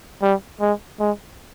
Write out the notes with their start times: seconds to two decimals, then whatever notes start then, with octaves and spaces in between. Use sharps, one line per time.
0.22 G3
0.61 G#3
1.00 G#3